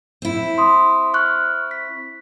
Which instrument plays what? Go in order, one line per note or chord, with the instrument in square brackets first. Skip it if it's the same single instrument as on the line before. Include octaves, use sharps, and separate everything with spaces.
[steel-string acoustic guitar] C4 E4
[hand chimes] C6 D#6
C#6 F6 F#6
B6